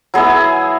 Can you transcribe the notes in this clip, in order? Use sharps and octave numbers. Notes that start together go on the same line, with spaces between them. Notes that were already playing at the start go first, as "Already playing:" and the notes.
F#3 B3 E4 G#4